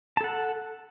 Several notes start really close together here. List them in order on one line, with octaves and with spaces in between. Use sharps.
A5 A4 F#5